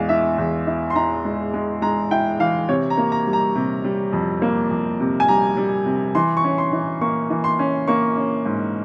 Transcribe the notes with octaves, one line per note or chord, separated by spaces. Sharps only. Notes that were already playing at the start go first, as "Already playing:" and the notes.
Already playing: E2 E3 G#3 F5
E4 E5
E2
E4
C6
E4 A#5
G#3
G#3
G#3 A#5
E4 G5
E3 F5
C3 C#5
A#5
A#3
A#5
G3
A#5
C3
G3
F2
A#3
F2
C3
G#5
G3 A#5
G3
C3
E3 C6
C#6
C#4
C6
E3
A#3 C#6
E3
C6
C#4
A#3 C#6
C#4
G#2